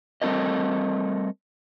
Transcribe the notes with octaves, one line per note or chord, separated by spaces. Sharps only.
G3 A3 C4 A4 A#4 D#5